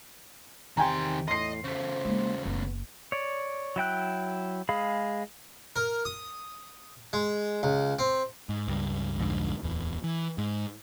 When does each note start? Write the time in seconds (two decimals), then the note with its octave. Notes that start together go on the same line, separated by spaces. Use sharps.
0.77 E2 C3 D#3 G5 G#5 A#5 C6
1.28 A2 D#5 C6 C7
1.64 C#3 A3 C5
2.05 G#3 A#3
2.45 F#1 B3
3.12 C#5 D5
3.76 F#3 E4 G5 F#6
4.69 G#3 G#4 F5 B5
5.76 A#4
6.05 D#6
7.13 G#3
7.63 C#2
7.99 C4
8.49 G#2
8.68 C#2 G2
9.18 C2 F2 G#2 D3
9.63 D1 E2
10.04 E3
10.38 G#2